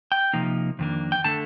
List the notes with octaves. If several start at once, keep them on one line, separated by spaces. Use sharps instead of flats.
G5
C3 F3 A#3 D#4
F2 D#3 A#3 D4
G5
D3 A3 A5